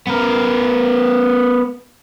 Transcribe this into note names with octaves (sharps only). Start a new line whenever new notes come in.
B3 A#4